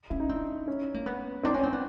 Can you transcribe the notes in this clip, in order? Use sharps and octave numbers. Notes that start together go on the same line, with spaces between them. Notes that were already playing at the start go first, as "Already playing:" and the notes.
C#4 E4
D#4
C4 D4
C#4
A#3
B3
C4 D4
C#4
C4
B3